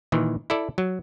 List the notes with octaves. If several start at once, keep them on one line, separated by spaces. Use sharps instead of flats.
A#2 D#3 E3
E4 A4 D5
F#3